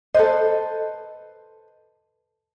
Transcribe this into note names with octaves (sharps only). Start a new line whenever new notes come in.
A4 B4 C5 D#5